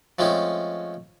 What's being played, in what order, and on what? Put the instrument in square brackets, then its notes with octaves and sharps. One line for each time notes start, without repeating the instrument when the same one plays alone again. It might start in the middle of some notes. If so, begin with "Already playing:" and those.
[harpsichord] F3 G#3 A3 C4 C#4